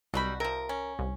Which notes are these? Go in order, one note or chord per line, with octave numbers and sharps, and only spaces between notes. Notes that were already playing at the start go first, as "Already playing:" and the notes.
C2 B2 F#3 G3 F#4 B5
C3 F3 A#4
C#4
C2